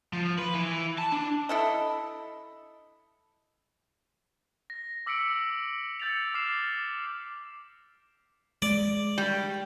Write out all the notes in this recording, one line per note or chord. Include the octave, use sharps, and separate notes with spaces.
F3
B4
E3
A5
D4
E4 A4 D#5
A#6
D6 E6 B6 C#7 D7 F#7
E6 G6 A6 C#7 F7
D6 F6 C7 E7
G#3 D5
G3